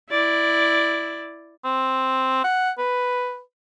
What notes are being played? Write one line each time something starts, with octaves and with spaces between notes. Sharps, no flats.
E4 D5
C4
F#5
B4